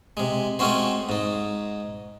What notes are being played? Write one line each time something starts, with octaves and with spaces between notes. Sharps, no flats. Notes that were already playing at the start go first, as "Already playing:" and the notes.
C3 G#3
G#3 A3 C4 C#4 F#4 C5
G#2 D#4